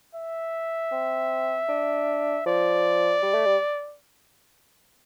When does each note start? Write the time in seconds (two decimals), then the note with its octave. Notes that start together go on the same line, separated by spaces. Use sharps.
0.15 E5
0.92 C4
1.69 D4
2.46 F3 D5
3.23 G3
3.34 A3
3.46 G3